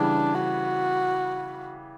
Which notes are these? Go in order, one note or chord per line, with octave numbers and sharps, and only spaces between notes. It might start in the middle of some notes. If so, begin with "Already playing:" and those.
Already playing: C#3 E3 G3 D4
F#4